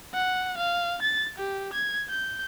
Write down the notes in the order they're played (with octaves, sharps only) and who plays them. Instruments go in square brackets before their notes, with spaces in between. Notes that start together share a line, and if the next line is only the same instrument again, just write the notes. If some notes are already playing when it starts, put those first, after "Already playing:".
[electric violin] F#5
F5
A6
G4
G#6
G6